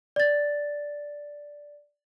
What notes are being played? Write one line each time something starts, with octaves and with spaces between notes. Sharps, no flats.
D5 A6